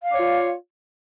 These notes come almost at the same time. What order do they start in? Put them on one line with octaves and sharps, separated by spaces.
F5 D5 C#5 F4